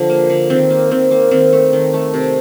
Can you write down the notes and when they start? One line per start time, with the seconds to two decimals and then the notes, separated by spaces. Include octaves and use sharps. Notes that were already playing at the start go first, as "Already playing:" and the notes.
Already playing: D3 F3
0.10 A#3
0.30 D3
0.50 D#3 C4
0.70 A#3
0.91 D#3 C4
1.11 A#3
1.31 D#3 C4
1.53 A3
1.73 D#3
1.94 A3
2.14 C3